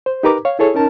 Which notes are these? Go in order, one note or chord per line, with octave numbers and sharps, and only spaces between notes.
C5
D#4 G4 A#4 B4 A#5 D6
C#5 F5
E4 G#4 A4 C#5
C#4 D#4 A#4 A5